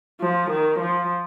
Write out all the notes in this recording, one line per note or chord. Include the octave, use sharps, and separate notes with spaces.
F3
D#3
F3